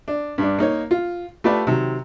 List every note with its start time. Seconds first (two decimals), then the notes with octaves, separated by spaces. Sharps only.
0.08 D4
0.38 G2 D4
0.58 A#3 D#4 C#5
0.91 F4
1.44 A3 F4 G4 B4 D5 A5
1.67 C3 D#3 F#3